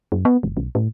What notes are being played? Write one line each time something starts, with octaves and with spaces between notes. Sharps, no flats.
F#2
B3
F#1
B1
A2